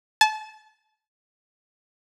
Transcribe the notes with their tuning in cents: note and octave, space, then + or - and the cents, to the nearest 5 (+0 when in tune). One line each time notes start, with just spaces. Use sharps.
A5 -30